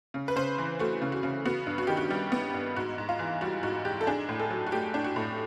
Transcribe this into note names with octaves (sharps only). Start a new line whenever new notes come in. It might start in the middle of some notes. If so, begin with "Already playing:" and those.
C#3
B4
C#3 C5
E3
A3 F#4
C#3
F#4
C#3
B3 F#4
G2
F#4
D#3 G4
F#4
G3
B3
G2
G#2 F#4
G#2
F4
E3
G3 F#4
G#2 F#4
G#2 G4
A4
D4 G#4
A2
A4
F#3
F#4
A3 G4
D4
F#4
A2